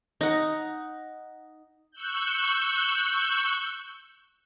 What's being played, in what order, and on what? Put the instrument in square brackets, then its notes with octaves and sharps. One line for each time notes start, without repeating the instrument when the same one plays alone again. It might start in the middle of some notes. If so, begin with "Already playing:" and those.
[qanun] D#4 F#5
[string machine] C#6 E6 F#6 G6